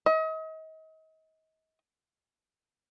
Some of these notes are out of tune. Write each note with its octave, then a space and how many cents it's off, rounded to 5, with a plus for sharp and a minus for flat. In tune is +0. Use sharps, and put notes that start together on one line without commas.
D#5 +35